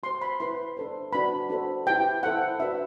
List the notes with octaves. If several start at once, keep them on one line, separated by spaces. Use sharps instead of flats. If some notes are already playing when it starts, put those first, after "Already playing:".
F#4 C5 C6
B5
E4 B4 C6
D4 A4 C5
D4 F#4 B4 B5
D4 F#4 A4 C5
E4 G4 B4 G5
E4 A4 C5 F#5
D4 F#4 B4 E5